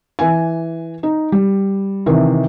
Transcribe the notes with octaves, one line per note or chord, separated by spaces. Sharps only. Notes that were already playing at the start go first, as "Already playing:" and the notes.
E3 G#5
D#4
G3
C3 D#3 E3